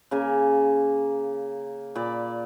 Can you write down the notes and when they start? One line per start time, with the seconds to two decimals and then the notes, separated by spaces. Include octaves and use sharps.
0.11 C#3 A#3 G#5
1.95 A#2 D5 B5